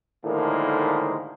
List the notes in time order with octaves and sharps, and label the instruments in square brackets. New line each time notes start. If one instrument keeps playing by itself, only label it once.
[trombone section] A2 D3 D#3 F3 G#3 A#3